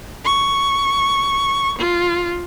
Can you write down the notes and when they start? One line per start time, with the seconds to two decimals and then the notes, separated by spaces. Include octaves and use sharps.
0.25 C#6
1.79 F4